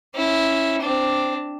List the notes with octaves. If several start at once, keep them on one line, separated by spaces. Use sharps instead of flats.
C#4 E4
C4 D4